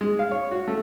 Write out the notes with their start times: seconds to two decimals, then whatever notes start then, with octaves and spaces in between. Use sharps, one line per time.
0.01 G#3
0.19 F5
0.31 C#5
0.51 F#4
0.68 A3